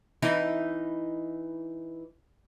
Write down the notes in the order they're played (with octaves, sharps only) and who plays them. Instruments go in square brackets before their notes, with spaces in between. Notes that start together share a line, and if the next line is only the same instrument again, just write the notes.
[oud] E3 D#4 E4